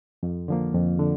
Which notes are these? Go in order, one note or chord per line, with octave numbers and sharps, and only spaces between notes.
F2
D3 F3 A#3
F2
D3